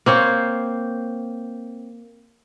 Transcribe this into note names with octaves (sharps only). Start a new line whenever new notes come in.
A#3 C4 C#5